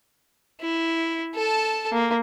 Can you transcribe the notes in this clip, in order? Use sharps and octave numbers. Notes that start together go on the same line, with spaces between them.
E4
A4 A5
A#3